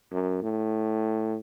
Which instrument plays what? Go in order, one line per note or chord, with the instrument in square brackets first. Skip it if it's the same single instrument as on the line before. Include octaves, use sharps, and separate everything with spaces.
[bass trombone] F#2
A2